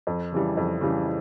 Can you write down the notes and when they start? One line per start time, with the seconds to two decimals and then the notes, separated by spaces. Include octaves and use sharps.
0.07 F2
0.32 C#3 E3 G3
0.57 F2
0.81 C#3 E3 G3